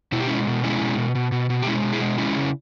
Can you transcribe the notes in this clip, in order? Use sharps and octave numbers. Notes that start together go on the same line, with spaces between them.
B2 E4
G4
G#3 C#4 E4
B2
G#3 C#4 E4
B2
B2
B2
B2
B2
G4
G#3 C#4 E4
B2
E4 G#4
G#3
G#3 C#4 E4
C#3